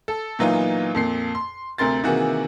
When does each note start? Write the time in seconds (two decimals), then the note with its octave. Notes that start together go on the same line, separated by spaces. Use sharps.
0.08 A4
0.39 A#2 E3 F#3 B3 D#4 F4
0.95 F2 A#2 C7
1.35 C6
1.78 D2 C3 A#4 C6 A6
2.04 C3 D#3 E3 A#3 F#4 G#4